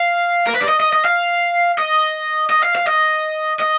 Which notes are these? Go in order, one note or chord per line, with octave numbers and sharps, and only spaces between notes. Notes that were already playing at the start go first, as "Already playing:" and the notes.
Already playing: F5
A#4
B4
D5
D#5
D#5
D#5
F5
D#5
D#5
F5
F5
D#5
D#5